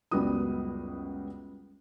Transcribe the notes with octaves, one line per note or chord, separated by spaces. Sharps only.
C#2 F#2 G3 B3 F#4 D#6